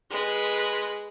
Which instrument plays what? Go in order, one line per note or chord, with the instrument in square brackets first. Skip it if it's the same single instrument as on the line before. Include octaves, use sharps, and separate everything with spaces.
[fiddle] G#3 B4